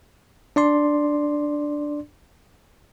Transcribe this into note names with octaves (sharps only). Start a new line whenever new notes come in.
D4 D5 C6